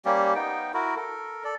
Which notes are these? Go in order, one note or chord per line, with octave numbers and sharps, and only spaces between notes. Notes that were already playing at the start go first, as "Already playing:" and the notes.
G3 A#3 C#4 G4
B3 D#4 G5
E4 F#4 A#4
A4 A#4
A4 D5